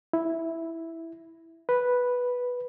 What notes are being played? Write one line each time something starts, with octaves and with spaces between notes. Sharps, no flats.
E4
B4